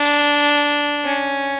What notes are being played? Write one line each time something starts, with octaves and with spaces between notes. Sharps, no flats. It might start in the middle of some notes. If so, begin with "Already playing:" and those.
Already playing: D4
C#4